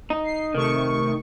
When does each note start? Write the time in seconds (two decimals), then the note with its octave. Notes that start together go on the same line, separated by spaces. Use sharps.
0.10 D#4
0.24 C7
0.55 C3 D#3 A3 C#6